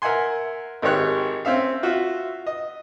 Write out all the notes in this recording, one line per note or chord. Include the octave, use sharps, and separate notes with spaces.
A#4 E5 F#5 G#5 C6
G#1 D#3 G4 C#5 F#6
C4 C#4 E5 F5
F4 F#4 E5
D#5